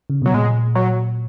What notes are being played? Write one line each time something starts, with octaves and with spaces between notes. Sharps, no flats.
C#3
B2 F#3
A#2 G#3
F#3